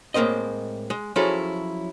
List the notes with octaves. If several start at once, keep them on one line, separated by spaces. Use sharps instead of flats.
A2 G#3 A#3 C4 D#5
G#3
F3 F#3 C#4 E4 G#4 A4